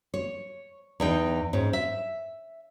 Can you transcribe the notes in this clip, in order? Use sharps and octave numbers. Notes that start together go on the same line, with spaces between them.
C#5
E2 D#4 G5
G#2 C#4
E5